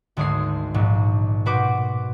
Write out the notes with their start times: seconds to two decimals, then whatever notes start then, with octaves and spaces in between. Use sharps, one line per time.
0.17 G#1 D2 G#3 G#4 D#6 C7
0.74 A#1 G#2
1.46 B2 F#4 B4 C5 D6